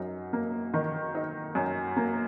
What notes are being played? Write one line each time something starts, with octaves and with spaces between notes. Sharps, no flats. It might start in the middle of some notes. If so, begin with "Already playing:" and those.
Already playing: F#2 D#4
A#3
D#3
D#4
F#2
A#3